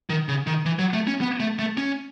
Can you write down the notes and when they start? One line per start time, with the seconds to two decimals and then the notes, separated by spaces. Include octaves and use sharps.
0.10 D#3
0.28 C#3
0.47 D#3
0.65 E3
0.79 F#3
0.93 A3
1.07 C#4
1.21 B3
1.40 A3
1.59 A3
1.77 C#4